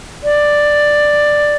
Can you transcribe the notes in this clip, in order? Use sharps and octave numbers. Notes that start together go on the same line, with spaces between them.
D5